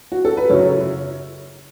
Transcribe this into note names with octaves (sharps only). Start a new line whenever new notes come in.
F#4
A4
B4
F#2 C#3 F#3 C#5